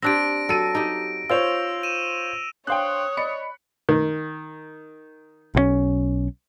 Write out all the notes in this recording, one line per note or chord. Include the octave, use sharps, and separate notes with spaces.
C4 D4 G4 A#6 D7
F#3 A4 D#7
D#4 G4
F4 C5 C#5 E6 F7
D#7 E7
D4 C5 C#5 F5 G5 C6 D#6 F#6
D5 D#5 B5 C#7
D#3
B1 E3 C#4